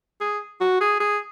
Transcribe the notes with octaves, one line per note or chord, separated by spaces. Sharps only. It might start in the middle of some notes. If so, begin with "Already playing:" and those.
G#4
F#4
G#4
G#4